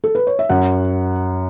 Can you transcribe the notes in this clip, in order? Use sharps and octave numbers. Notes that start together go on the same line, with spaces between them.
A4
B4
C#5
E5
F#2 F#5